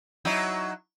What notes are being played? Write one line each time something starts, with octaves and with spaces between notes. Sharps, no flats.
F#3 D#4 E4